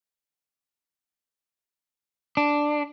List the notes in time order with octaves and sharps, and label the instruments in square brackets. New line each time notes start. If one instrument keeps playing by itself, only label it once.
[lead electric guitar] D4